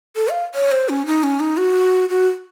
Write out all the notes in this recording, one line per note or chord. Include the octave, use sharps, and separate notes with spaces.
A4
F5
C#5
C5
C#4
D#4
C#4
D#4
F#4
F#4